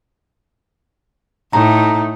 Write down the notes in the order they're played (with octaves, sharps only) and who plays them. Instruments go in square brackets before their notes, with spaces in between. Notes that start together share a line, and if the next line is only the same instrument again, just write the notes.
[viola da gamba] A2 [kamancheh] A3 D#4 [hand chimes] A#5